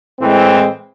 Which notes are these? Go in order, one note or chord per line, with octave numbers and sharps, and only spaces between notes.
A2 E3 G#3 C4